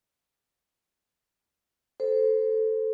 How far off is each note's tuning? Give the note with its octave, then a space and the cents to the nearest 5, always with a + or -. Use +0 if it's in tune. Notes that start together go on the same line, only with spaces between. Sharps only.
A4 +0 C5 +0